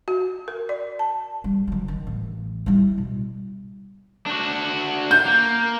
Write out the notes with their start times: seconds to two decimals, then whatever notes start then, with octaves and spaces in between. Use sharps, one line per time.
0.08 F#4
0.48 A#4
0.69 D5
0.99 A5
1.44 G3
1.67 D#3 F#3
1.88 D#3
2.07 A1
2.66 G3 E4
2.98 B2
4.26 D4 F#4
5.11 G6
5.26 A#3